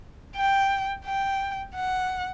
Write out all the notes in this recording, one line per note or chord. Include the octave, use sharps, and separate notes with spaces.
G5
G5
F#5